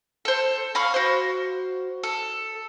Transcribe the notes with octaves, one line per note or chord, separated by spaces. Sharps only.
A4 C5
F5 B5 C#6 F6
F#4 C5
A4